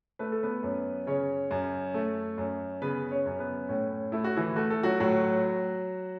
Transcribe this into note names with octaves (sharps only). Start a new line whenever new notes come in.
A3 B4
A4
B3 B4
F#2
C#3 C#4 C#5
F#2
A3
F#2
C#3 B3 B4
C#4 C#5
F#2
B3 B4
A2 C#4
A3 E4
F#4
E3 E4
A3 F#4
A4
F#3 F#4
A2 F#3 F#4